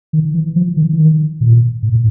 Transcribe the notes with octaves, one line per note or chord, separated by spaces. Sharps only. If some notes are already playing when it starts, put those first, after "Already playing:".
D#3
E3
F3
D#3
E3
D#3
A#2
A2
A2